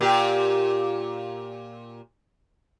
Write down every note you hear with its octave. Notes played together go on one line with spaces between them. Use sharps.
A#2 G4